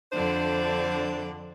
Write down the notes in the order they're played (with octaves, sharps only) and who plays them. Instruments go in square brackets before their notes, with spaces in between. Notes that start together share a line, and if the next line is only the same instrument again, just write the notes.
[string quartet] F2 D3 D5 [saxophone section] D4 C5